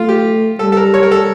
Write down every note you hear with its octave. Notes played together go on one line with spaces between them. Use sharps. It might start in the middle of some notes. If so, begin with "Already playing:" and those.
Already playing: A3 F4
G4
G3 A4
A4
A#4
C#5
A#4
A4